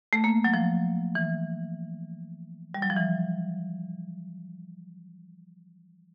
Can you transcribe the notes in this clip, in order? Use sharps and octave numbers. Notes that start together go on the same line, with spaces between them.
A3
A#3
F#3
F3
E3
G3
F#3
F3
E3